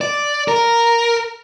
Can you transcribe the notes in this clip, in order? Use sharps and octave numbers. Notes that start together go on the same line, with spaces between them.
D5
A#4